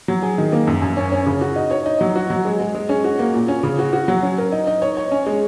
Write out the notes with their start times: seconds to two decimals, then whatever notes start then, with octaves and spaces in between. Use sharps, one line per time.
0.08 F#3
0.23 G#4
0.38 D#3
0.52 A#3
0.67 F#2
0.82 F#2
0.97 C#4
1.12 C#4
1.26 C#3
1.41 F#4
1.56 D#4
1.71 C#5
1.86 D#4
2.01 F#3
2.16 F#4
2.30 F#3
2.45 G#3
2.60 G#3
2.75 G#3
2.89 C#4
3.04 F#4
3.19 A#3
3.34 A#2
3.48 C#4
3.63 C#3
3.79 F#4
3.93 F#4
4.08 F#3
4.23 C#4
4.38 A#4
4.52 D#4
4.67 D#4
4.82 C#5
4.97 C#5
5.11 C#4
5.27 G#3